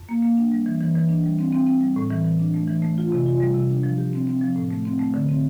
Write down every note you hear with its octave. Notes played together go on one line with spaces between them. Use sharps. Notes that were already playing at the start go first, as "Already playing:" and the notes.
Already playing: F2
A#3
A#3
D4
G3
E3
E3
E3
D4
G3
C4
C4
C4
G3
A2
E3
E3
D4
A3
E3
A3
F4
C3
F4
G3
C3
D4
F3
G4
C4
C4
F3
A2
A3
C4
A3
D3
C4